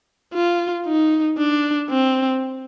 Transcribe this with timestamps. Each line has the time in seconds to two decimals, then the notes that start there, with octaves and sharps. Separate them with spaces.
0.34 F4
0.87 D#4
1.38 D4
1.90 C4